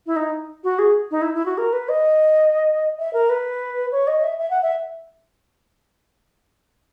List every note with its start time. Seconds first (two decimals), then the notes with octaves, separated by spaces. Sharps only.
0.07 E4
0.16 D#4
0.64 F#4
0.79 G#4
1.11 D#4
1.22 E4
1.34 E4
1.46 F#4
1.58 A#4
1.73 B4
1.89 D#5
2.99 E5
3.13 A#4
3.29 B4
3.92 C#5
4.07 D#5
4.24 E5
4.38 E5
4.50 F#5
4.62 E5